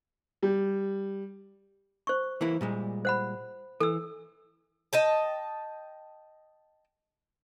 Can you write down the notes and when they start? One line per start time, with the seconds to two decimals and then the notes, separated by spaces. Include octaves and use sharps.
0.43 G3
2.07 C5 C#6
2.41 E3 A#3 E4
2.61 A#2 G3 G#3
3.05 C5 F#5 B5
3.80 E3 A4 E6
4.93 D#5 G5 A5